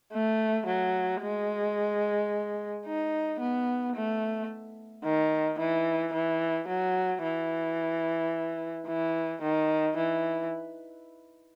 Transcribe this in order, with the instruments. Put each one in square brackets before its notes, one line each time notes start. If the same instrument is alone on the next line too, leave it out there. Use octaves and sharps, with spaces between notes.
[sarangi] A3
F#3
G#3
D#4
B3
A3
D#3
E3
E3
F#3
E3
E3
D#3
E3